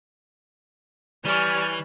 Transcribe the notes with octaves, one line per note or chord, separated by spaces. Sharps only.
E3 G3 C#5 G#5 F6